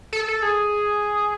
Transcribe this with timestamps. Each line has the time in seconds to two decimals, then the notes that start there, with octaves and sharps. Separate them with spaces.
0.13 A4
0.28 A4
0.42 G#4